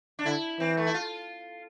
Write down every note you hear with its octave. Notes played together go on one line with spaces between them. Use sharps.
D4
D3 E4
E3 C4
A3
E4
F4